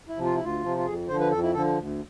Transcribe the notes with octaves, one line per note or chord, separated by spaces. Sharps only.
E4
C3 F3
F4
E4
D2 F4
C3 F3
F4
F2 G#4
D3 F3 C5
B4
F2 A4
E4
D3 F3 A4
D2